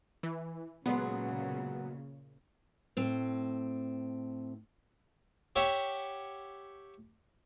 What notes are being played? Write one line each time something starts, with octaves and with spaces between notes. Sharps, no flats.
E3
A#2 C#3 F#3 G#3 B3
A2 C4
G4 C#5 E5 F#5